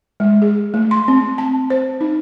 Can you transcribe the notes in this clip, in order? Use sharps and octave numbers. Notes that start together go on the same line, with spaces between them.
G#3
G#4
A3
C6
C4
A5
C5
D#4